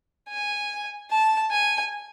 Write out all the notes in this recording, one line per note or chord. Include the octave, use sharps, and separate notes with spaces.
G#5
A5
G#5